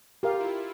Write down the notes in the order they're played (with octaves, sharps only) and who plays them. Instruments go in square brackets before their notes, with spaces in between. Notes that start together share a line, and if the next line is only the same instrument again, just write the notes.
[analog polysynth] F4 [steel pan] G4 A#4 F5
[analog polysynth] E4